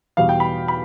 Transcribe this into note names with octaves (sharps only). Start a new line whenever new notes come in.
E2 B2 G3 F5
G5
B5
B5